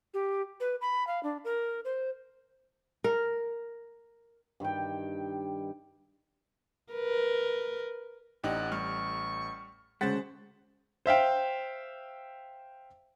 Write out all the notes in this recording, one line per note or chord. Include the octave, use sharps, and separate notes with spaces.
G4
B4
B5
F5
D4
A#4
C5
A#4
G2 D#3 G4 G5
A#4 B4
A1 D4 D#4 G4 F#5
G3 C#6 F6
D2 C#3 G#3 C5 F#5 A6 B6
C5 E5 F5 G5